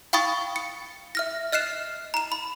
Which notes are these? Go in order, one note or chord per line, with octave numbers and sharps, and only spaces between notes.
F5 G5 B5 C#6 D#6 A6
C#7
E5 F6 A#6
D#5 F6 F#6 C7 E7
A#5 E7
B5